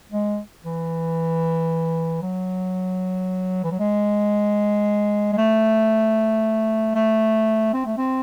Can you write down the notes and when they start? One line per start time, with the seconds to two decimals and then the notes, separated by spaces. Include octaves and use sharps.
0.11 G#3
0.64 E3
2.22 F#3
3.64 E3
3.71 F#3
3.79 G#3
5.32 G#3
5.37 A3
6.95 A3
7.73 C4
7.86 A3
7.97 C4